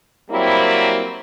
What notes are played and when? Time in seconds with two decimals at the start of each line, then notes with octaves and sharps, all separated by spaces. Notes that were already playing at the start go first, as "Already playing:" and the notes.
0.31 F#3 G3 A#3 C4 E4